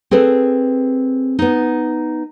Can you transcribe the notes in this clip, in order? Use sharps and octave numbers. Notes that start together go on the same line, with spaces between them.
C4 G#4 A4 B4
B3 D#4